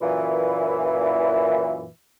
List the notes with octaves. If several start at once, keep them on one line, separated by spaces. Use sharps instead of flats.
F#2 A#2 E3